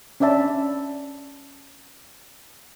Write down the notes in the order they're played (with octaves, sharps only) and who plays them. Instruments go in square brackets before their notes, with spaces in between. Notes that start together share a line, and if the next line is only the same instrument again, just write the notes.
[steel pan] C#4 D4 D5 E5 A5